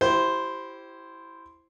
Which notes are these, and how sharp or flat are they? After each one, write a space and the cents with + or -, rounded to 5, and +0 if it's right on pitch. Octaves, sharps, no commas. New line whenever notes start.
E4 +10 G4 -25 C5 +0